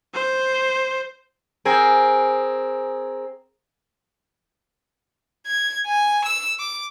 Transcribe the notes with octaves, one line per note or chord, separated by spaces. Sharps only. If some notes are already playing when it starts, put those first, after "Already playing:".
C5
C4 G#4 A#4
G#6
G#5
E6
D6